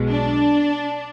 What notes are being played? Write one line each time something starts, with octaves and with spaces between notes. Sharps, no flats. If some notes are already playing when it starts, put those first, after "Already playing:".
Already playing: B1 B2 G#3
D4